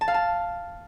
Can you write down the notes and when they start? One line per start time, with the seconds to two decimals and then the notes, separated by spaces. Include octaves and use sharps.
0.01 A5
0.08 F5
0.14 A5